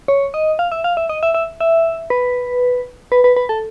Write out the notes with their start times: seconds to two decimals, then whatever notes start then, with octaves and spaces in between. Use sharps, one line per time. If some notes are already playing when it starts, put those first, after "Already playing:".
0.08 C#5
0.34 D#5
0.59 F5
0.72 E5
0.84 F5
0.97 E5
1.09 D#5
1.23 E5
1.35 E5
1.60 E5
2.10 B4
3.12 B4
3.24 B4
3.36 B4
3.49 A4